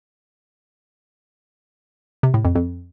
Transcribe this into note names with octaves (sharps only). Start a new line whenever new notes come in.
C3
A2
F2
F2